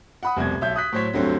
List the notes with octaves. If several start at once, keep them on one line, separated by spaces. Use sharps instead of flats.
F#5 B5 D#6
F1 C2 B2 G#6
B1 E5 G6
D#6 F#6 B6
A2 F#3 C5 C#5 B6
D2 G2 F#3 A3 C4